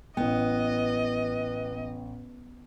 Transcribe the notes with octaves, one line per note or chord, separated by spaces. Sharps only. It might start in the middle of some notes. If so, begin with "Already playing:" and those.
A1 B3 D#5 G5